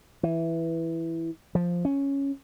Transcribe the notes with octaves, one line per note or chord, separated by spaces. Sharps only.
E3
F3
C#4